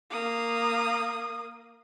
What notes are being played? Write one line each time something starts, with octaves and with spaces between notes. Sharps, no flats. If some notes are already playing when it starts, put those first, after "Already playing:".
A#3 D#6